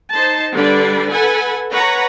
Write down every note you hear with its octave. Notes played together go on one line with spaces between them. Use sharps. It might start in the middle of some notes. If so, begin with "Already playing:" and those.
D#4 C5 A5
D3 G3 D4 B4 D5
A4 B4 F#5 G#5
B4 C#5 F#5 A#5 B5